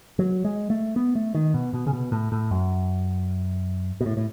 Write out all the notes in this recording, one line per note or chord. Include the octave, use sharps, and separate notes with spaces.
F#3
G#3
A3
B3
A3
D#3
B2
B2
C#3
B2
A2
A2
F#2
B2
A2
A2